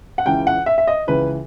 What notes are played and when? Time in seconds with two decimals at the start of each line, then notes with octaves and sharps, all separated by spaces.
0.18 F#5
0.26 C#2 C#3 E3 G5
0.47 F#5
0.66 E5
0.78 E5
0.87 D#5
1.07 C#2 C#3 E3 B4